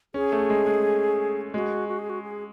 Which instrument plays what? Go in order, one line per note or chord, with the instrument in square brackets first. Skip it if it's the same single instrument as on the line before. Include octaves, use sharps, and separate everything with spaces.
[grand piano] C#4 [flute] G#4
[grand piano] A3
G#3
G#3
[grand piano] G#3 [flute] F#4
[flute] F#4
G#4
F#4
G#4